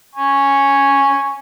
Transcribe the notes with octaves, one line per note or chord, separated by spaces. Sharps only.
G#5 C#6